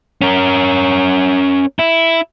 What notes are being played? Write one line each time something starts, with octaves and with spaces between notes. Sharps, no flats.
C#4 A#4
E4